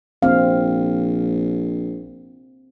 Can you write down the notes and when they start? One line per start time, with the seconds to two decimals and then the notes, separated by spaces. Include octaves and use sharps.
0.22 A#1 C4 F5